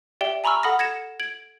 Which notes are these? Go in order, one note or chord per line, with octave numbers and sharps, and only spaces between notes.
G4 D5 E5 G5 G7
G#5 A#5 B5 C#6 E6 F6
A4 F#5 B5 D#6 F6 A#6
G#6 A#6 C#7 E7
G#6 D7 F#7